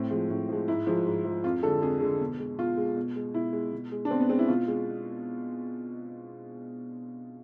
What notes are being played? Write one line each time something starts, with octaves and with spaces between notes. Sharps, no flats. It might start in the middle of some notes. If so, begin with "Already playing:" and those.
Already playing: A2 C4
F3 G#3
A2
F3 G#3
G#2 E4
F3 G#3
G#2
F3 G#3
F2 F4
D3 G#3 A4
F2 G#4
D3 G#3
B2
G#3
B2 F4
G#3
B2
G#3
B2 E4
G#3
B2
G#3
D4
B2 C4
B3
G#3 C4
E4
B2 F4
G#3